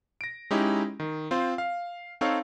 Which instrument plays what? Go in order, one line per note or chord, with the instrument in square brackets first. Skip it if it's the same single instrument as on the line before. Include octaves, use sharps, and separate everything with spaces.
[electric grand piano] A#6 D7
G#3 C#4 D#4 E4 G4
D#3
C4 F4 C5
F5
C4 D#4 A4 C#5 F5